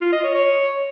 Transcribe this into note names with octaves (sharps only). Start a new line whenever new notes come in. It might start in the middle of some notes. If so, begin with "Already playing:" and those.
F4
D#5
C#5
C#5